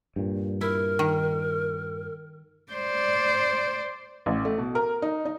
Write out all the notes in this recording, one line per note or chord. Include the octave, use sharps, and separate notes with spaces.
G2 A#2
E4 A#4
D#3
C5 D5
A1
A3
B2
A#4
D#4
D#4